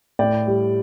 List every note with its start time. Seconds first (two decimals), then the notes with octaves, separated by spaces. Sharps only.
0.19 A2 D5 G5
0.47 G3